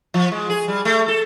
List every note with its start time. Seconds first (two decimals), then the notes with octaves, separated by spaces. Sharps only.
0.14 F3
0.32 G#3
0.50 G#4
0.68 G3
0.85 A3
1.08 A4